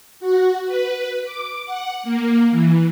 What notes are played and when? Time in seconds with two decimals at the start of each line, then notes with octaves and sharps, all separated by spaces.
0.20 F#4
0.66 B4
1.25 D6
1.65 F#5
2.03 A#3
2.51 E3